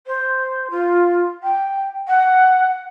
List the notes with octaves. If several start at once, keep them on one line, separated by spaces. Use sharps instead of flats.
C5
F4
G5
F#5